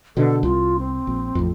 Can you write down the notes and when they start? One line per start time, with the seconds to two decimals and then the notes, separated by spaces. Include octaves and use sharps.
0.17 B2 D3 A4
0.43 C2 F4
0.79 C4
1.07 A#1
1.35 A1 F2